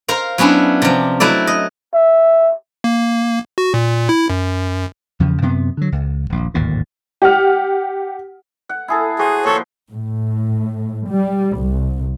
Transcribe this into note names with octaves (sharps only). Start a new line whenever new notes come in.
A#4 C5 F5
F#3 B3 C#4 D4 E4
C3 F3
F#3 A3 E4 D5
D#5
E5
A#3
F#4
A#2
E4
F#2
E2 C#3 F3
F#2 C3 A#3 B3
D3 F#3
C#2
D#1 A#1
D1 G#1 D#2 A#2
G4 F#5 F6
F#5
E4 G#4 A4
F#4 G#4 C5
A#2 F3 A4 C5 C#5
A2
G3
C2